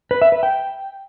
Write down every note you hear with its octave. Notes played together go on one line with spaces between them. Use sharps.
B4
E5
B4
G5